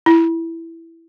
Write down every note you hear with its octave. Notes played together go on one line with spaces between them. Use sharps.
E4